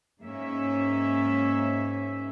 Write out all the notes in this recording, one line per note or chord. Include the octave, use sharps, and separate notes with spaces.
G#2 A#3 C#4 E5